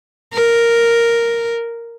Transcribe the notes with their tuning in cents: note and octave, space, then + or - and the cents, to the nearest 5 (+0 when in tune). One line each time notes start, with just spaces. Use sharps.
A#4 +0